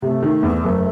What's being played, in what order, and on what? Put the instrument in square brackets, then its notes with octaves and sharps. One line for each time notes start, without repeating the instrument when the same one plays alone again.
[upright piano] C3 [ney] A3
[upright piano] D#3
E2
F#1